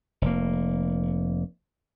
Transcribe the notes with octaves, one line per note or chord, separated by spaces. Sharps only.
F1 A#3